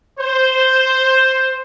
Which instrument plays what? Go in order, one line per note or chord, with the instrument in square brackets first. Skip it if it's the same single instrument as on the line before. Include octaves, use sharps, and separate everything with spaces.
[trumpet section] C5